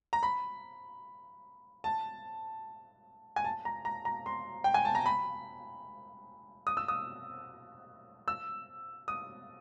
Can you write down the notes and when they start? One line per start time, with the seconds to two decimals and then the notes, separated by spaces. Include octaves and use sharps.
0.13 A#5
0.23 B5
1.84 A5
3.36 G#5
3.44 A5
3.65 A#5
3.85 A#5
4.05 A#5
4.26 C6
4.64 G5
4.74 G#5
4.85 A5
4.95 A#5
5.06 B5
6.67 D#6
6.77 E6
6.88 D#6
8.28 E6
9.08 D#6